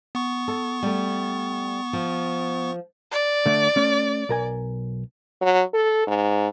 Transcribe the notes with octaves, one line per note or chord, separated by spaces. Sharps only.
B3 C#6
A4
G3 A3
F3
D5
D3 A3 E5
A3 C#4
B1 A#4 G#5
F#3
A4
G#2